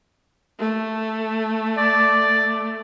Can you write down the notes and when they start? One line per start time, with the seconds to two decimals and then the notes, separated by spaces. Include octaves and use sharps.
0.59 A3
1.78 D5